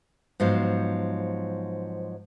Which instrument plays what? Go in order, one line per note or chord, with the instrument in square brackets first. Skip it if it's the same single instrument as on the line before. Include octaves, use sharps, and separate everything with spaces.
[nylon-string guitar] G#2 F3 F#3 B3 C5